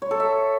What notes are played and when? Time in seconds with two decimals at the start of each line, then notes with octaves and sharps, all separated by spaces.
0.02 C#5
0.11 A4
0.20 E5